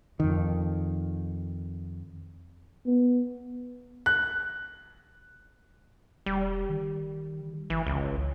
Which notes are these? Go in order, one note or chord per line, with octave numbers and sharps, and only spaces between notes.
F2 D#3
B3
F#6
E1 G3
D#3
G1 E3
C#2